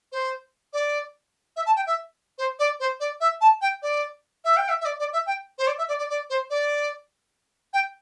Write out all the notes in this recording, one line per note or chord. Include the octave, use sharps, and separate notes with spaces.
C5
D5
E5
A5
G5
E5
C5
D5
C5
D5
E5
A5
G5
D5
E5
G5
E5
E5
D5
D5
E5
G5
C5
D5
E5
D5
D5
D5
C5
D5
G5